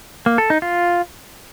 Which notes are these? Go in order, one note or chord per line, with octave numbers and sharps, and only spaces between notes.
A#3
A4
D#4
F4